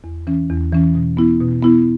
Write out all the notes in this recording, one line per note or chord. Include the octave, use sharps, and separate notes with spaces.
E2
E3 C#4
E2
E3 C#4
B2
B3 E4
B2
B3 E4